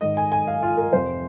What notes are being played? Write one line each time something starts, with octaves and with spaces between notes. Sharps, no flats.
G#2 D#3 D#5
G#5
G#5
F5
F4
A#4
F2 C3 F3 C5